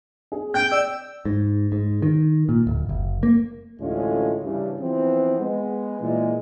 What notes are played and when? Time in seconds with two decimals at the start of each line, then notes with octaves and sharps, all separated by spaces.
0.32 G#4
0.54 G5 G6
0.71 D5 E6
1.25 G#2
1.72 G#2
2.02 D#3
2.49 A#2
2.67 D1
2.89 F#1
3.23 A#3
3.80 A1 D2 A2 G#3 C#4 F4
4.41 G2 C#3 E3
4.79 E3 F3 B3 C4
5.39 G#3 B3
6.00 A#2 E3 G#3